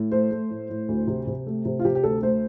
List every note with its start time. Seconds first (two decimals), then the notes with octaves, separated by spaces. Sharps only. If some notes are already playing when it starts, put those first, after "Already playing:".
Already playing: A2
0.12 A3 C5
0.31 A3
0.50 A2
0.69 A2
0.88 D2
1.07 C3
1.27 C3
1.46 A3
1.65 C3
1.79 F4
1.85 C3 G4
1.95 G4
2.03 D2 A4
2.23 A3 C5